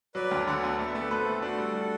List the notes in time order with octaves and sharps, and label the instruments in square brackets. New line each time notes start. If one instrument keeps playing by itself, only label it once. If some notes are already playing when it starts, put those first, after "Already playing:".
[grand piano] F#3 [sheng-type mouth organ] B4 D5
[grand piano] D2
[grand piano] D3 [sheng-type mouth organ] D5 F#5
[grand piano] B3
[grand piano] A3 [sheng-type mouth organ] D5
[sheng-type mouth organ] E5
[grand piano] A3 [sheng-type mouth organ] B4 D5
[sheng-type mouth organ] A4 C5 [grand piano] B4
[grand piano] A3
[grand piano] D4 [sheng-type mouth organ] F#4 A4
[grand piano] G3
D4